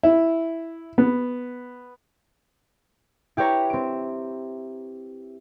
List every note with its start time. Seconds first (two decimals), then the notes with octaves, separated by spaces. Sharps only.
0.03 E4
0.98 B3
3.37 E4 G4 B4 C#5 A#5
3.70 C4 D7